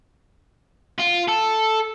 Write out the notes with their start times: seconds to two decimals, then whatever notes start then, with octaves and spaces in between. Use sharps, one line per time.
1.00 F4
1.29 A4